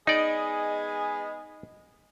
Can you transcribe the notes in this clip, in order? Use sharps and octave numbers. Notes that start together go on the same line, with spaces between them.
G#3 B3 D#4 G#4 D5 D#5